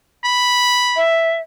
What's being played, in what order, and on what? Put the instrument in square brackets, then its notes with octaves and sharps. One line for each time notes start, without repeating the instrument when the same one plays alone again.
[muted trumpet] B5
[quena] E5